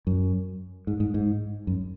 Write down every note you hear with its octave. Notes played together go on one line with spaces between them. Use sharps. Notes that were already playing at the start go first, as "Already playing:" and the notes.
F#2
G#2
G#2
G#2
F#2